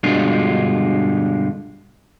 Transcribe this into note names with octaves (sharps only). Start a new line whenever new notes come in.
G2 B2 D3 G#3 D4 F4